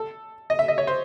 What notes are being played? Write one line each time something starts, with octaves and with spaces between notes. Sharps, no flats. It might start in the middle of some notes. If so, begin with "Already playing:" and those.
Already playing: A4
D#5
E5
D#5
C#5
C5